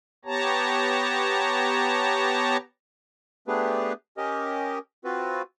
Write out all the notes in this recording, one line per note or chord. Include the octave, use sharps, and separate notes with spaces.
B3 G4 C#5 A5 A#5
A3 B3 D4 G4 G#4 B4
C#4 G4 A#4 D#5
C4 F4 F#4 B4